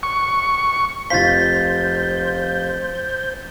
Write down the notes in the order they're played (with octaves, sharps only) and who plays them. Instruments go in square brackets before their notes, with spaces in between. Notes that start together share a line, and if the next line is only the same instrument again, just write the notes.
[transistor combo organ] C#6
[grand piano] F1 F4 F5 [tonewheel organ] C5 G6 [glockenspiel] A6 B6